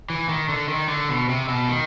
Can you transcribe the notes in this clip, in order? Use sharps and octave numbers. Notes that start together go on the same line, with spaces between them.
E3
D#3
D3
D#3
D3
B2
C3
B2
D#3